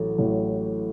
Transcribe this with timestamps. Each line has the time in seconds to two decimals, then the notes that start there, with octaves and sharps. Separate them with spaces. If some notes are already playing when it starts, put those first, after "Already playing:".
Already playing: A1 A2 F#3 A4
0.18 A1 A2 F#3